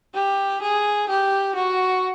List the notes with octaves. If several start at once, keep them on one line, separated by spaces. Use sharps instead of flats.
G4
G#4
G4
F#4